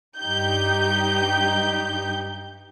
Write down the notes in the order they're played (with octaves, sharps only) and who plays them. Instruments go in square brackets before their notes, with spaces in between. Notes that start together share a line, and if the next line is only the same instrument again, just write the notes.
[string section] G2 D#4 G4 G6